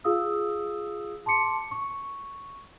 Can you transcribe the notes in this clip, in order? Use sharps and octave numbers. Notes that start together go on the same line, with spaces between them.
F4 G#4 F5 D#6 E6
A5 C6 D6 C#7
C#6